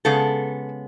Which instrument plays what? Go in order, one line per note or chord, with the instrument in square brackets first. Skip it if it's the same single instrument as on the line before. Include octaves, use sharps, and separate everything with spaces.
[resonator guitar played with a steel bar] C#3 G#3 B3 A4